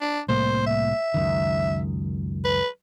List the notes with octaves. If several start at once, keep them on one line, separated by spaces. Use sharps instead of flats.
D4
C2 A2 A#3 C5
E5
C#2 F#2 D#3
B4